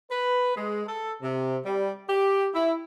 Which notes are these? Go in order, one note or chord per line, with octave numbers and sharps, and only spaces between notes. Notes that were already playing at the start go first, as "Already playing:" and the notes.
B4
G#3
A4
C3
G3
G4
E4